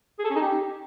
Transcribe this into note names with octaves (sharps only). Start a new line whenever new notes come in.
G#4
A4
C#4
D#4
G4